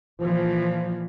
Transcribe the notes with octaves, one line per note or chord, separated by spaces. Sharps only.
A#2 E3 F3